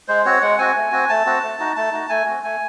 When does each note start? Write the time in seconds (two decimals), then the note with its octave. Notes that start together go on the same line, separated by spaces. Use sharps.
0.08 G#3 C5
0.25 C4 F#4 C#5
0.42 G#3 F#5
0.58 C4 F#4 G#5
0.76 A3
0.92 C4 F#4
1.09 A3 A5
1.25 C4 F#4
1.43 A3
1.60 D#4 F#4
1.76 A3 A5
1.92 D#4 F#4
2.09 A3 G#5
2.26 C4 F#4
2.43 A3 G#5